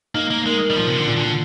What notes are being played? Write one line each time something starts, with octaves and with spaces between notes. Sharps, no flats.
A#3 D#4
A#3
G#3 A#4
G3
A#2 F3
C3
D3
A#2
D3